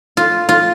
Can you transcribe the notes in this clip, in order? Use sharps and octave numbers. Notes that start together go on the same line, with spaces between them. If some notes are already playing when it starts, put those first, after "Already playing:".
F4
F4